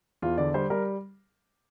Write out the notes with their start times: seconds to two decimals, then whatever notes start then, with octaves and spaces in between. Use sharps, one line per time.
0.22 E2 F4
0.38 D3 D5
0.54 G3 C5
0.70 G3 A#4